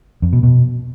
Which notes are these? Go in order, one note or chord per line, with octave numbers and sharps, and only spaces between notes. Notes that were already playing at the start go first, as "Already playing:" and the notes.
F2
B2
B2